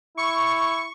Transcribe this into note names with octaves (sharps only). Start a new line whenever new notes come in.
E4 C#6